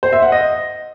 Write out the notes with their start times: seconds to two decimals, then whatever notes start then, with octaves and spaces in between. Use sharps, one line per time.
0.03 C5
0.13 E5
0.22 F#5
0.32 D#5